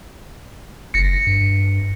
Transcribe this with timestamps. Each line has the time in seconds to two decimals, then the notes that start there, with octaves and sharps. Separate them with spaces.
0.94 F#1 A#6 C#7
1.27 G2